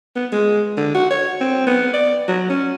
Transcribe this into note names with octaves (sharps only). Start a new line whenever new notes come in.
B3
G#3
D3
F#4
C#5
C4
B3
D5
F#3
C#4